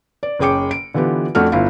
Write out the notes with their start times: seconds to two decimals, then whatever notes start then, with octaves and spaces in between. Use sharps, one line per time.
0.23 D5
0.39 F#1 C#4 G#4 G5 D6 C#7
0.71 D7
0.94 D3 E3 B3 F4 G4
1.35 F2 A3 D4 F#4 A4 F6
1.52 G1 E4 F4 F5